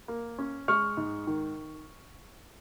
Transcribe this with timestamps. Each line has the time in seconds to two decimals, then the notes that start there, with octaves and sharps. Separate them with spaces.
0.08 A#3
0.39 C#4
0.68 G#3 C#6 F6
0.97 G#2
1.27 D#3